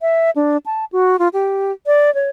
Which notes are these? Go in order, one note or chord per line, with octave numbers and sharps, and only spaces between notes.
E5
D4
A5
F#4
F4
G4
D5
C#5